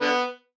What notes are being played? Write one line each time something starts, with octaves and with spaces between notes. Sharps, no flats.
D3 B3